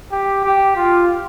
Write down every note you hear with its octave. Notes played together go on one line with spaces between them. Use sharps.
G4
G4
F4